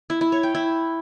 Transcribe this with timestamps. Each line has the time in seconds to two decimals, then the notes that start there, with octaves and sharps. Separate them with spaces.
0.10 E4
0.21 E4
0.32 C#5
0.43 G5
0.55 E4